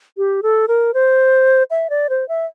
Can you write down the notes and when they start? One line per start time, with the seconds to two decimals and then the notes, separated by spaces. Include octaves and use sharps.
0.18 G4
0.43 A4
0.68 A#4
0.94 C5
1.70 E5
1.90 D5
2.10 C5
2.29 E5